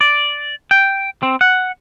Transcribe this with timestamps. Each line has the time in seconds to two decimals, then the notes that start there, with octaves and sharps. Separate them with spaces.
0.01 D5
0.71 G5
1.23 C4
1.41 F#5